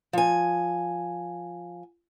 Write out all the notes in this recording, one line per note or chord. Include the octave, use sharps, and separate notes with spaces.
F3 G#5